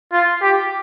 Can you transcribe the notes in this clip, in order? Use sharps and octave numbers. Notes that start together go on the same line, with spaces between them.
F4
G4